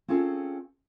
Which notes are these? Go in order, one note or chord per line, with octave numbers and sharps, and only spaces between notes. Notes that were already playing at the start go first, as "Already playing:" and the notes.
C4 C#4 F4 G#4 A4